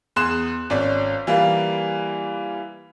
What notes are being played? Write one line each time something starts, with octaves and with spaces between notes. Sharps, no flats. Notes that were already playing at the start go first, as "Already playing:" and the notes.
E2 G#4 C6 F#6 E7
G#1 C#4 D5
E3 G3 A#3 F4